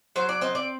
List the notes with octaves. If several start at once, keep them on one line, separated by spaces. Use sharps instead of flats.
F#3 C5
D5
C4 D#5
D5